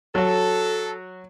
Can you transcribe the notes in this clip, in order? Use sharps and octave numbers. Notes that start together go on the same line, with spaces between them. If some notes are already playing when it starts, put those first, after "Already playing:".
F#3 F#4 A4